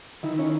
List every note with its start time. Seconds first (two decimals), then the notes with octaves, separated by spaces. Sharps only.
0.23 D#3 E4
0.38 C#4